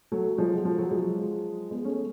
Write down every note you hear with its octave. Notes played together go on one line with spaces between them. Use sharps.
F#3 A3
F3 G#3
F#3
F3
F#3
F3 G#3
G#3 B3
A3 C#4